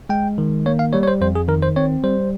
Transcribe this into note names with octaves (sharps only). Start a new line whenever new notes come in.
G#3 G5
D#3
A#3 C#5
F5
G3 C#5
C#5
C5
F2 C5
G#4
D#3 A#4
C5
C4 C#5
G3 C5